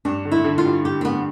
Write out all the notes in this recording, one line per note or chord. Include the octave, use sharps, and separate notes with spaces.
G2 D4
D3
E4
D3
F4
G3
D3 G4
C4
G3 B3